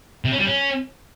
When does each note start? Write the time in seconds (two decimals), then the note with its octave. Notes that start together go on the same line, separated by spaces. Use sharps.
0.25 C3
0.32 C#4
0.39 G3
0.46 C#4